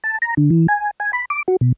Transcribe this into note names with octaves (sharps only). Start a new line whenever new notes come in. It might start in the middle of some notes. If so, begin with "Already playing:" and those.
A5
A#5
D3
E3
G#5
G#5
B5
D6
F#4
B2